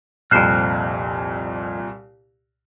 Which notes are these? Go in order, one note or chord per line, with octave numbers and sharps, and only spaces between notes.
C2 F2 A#2 C5 F6 F#6